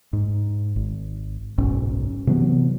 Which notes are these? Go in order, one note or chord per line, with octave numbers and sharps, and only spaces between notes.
G#2
G#1
F#1 B1 G#2 C#4
C3 E3 F#3 B3